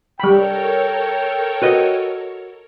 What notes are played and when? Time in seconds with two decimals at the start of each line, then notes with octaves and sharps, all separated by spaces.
0.20 G3 A4 A#4 C#5 G5 B5
1.62 F#4 B4 D#5